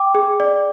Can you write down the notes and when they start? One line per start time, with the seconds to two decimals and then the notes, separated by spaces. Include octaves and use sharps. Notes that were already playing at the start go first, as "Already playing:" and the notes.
Already playing: G5 D6
0.15 G#4
0.40 D5